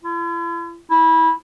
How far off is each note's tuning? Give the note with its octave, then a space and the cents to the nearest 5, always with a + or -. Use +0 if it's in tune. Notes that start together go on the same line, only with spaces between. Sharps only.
E4 +45
E4 -20